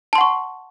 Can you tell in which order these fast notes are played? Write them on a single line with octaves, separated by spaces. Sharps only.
A5 C6 F#5 C#6